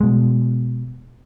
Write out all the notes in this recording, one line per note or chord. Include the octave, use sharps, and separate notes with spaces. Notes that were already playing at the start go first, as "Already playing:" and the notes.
B2 G#3